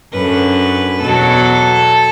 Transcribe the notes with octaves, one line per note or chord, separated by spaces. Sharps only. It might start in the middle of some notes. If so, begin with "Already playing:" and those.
F#2 D3 F#3 B4
E2 B2 F#3 A4